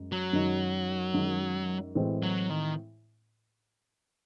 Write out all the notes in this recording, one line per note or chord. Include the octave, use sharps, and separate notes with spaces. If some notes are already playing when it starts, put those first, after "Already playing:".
Already playing: F#2 G#3
F#3
F#2 D#3 G#3 D#4
F#2 D#3 G#3 D#4
A2 E3 G#3 C4
F#3
D#3